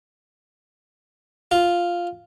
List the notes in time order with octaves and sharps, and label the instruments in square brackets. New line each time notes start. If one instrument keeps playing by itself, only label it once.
[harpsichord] F4